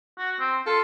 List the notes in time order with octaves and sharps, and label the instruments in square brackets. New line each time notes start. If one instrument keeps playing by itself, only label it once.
[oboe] F#4
C4
[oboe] F4 [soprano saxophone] A4